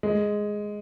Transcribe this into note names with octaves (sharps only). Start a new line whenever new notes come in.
G#3